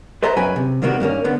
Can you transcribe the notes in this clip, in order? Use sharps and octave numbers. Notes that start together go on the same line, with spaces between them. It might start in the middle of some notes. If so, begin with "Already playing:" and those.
B4 C5 D#5 E5 A#5
F#2 F#3 B4 G5 G#5 B5
C3
C3 D#3 G3 A#3 B3 F#4
G2 D#3 A#3 C#4
D3 B3